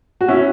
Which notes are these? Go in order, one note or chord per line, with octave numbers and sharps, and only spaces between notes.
F#4
C#4 E4